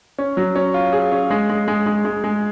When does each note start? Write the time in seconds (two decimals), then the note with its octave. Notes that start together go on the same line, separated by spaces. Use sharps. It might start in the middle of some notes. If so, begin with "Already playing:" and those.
0.18 C#4
0.37 F#3
0.56 C#4
0.74 F4
0.93 G#4
1.12 C#4
1.30 G#3
1.50 G#3
1.68 G#3
1.86 G#3
2.05 G#3
2.24 G#3